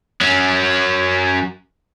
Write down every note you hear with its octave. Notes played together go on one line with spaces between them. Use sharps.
F#3 C#4